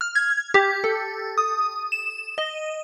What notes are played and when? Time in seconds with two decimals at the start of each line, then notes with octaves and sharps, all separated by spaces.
0.01 F6
0.15 G#6
0.54 G4
0.84 A4
1.38 D#6
1.92 E7
2.38 D#5